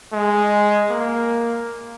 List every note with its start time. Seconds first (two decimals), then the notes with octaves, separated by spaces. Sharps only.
0.13 G#3
0.90 A#3